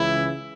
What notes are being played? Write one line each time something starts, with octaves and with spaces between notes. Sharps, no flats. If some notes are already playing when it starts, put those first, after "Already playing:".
Already playing: C#2 C#3 E3 E4